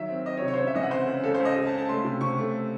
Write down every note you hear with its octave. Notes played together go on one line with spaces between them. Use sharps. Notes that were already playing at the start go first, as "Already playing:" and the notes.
Already playing: D#3 F#3 E5
C4
C4 D#5
C#5
C3
C#5
C5
C#3 C#5
E5
E3 D#5
F#5
C4 C5
C#3
C#2 A4
C5
C#2
D#5
G#3
A5
C#3
A5
A3 C6
C3
C3 C#6
A3